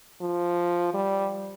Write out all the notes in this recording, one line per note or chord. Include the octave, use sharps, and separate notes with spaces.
F3
G3